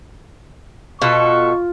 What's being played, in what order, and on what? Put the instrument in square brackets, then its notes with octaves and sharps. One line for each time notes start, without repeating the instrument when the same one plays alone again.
[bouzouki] B2 A4 [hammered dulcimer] F4 [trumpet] C#6